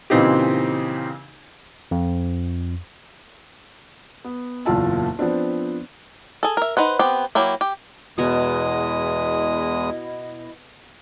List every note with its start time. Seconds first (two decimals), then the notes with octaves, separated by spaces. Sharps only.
0.10 A#2 C#3 E3 C4 D#4 G4
1.91 F2
4.24 B3
4.65 F#1 E2 A#2 F4 A5 E6
5.19 F3 B3 C4 D4
6.43 G#4 A4
6.57 A#4 E5
6.77 D#4 B4 C5 F#5
6.99 B3 C4 G4
7.35 F#3 A#3 E4 G4
7.61 G4
8.18 E2 B2 G#3 E4 C#5 D#5 A#5 D#6